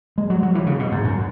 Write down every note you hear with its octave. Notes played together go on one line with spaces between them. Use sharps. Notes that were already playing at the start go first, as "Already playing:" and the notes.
G#3
F#3
F#3
E3
C#3
B2
G#2
F#2